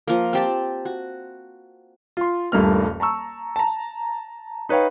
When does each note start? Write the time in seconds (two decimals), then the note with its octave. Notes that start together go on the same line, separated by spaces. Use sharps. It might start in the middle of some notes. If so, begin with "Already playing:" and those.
0.08 F3 A#3
0.33 C4 G4 A5
0.85 F#4
2.17 F4 C6
2.52 D#1 G2 A3 A#3 F6
3.00 A5 A#5 C#6 E6
3.56 A5 A#5
4.69 D#4 B4 C#5 F5 G5